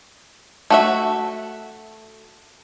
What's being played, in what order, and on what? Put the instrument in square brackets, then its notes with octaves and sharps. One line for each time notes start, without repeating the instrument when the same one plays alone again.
[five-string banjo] A3 F#4 E5